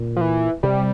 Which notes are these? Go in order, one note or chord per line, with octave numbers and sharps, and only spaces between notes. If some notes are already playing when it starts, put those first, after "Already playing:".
Already playing: A#2
F3
E3
C3 G3